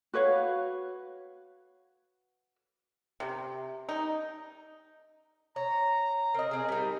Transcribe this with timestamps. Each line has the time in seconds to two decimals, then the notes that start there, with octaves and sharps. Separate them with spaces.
0.14 F#4 B4 C#5 F5
3.20 C3
3.89 D#4
5.56 C#5 A#5
6.34 C4 A#4 D#5
6.51 C4 G#4
6.68 G3 D#4